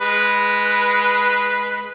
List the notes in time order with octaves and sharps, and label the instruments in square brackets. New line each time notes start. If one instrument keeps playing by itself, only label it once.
[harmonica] G#3 B4